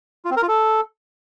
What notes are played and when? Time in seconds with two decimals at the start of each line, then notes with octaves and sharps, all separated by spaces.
0.25 F4
0.31 C4
0.37 A#4
0.42 F4
0.48 A4